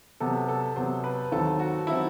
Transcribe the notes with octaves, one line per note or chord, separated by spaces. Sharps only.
C3 F#3 B3 A4
A4
C3 F#3 B3 C5
B4
D#2 D#3 F#3 C4 A4
F#4
D#3 F#3 C4 E4